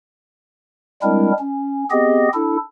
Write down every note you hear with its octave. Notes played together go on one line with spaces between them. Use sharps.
G3 G#3 C4 D4 E4 A#4
C#4
B3 C4 G4 G#4 D#5
D4 E4 A4